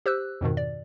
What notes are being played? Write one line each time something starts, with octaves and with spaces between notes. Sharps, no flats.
G4 C5 E6 F#6
F2 G#2 B2 D#3
D5